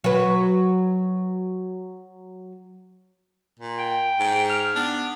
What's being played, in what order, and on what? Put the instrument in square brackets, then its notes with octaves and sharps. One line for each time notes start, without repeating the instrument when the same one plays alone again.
[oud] F#3 B4
[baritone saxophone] A#2
[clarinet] G5
[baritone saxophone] G#2
[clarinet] F6
[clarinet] B3 [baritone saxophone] D4